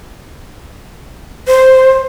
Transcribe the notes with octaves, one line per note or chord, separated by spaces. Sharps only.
C5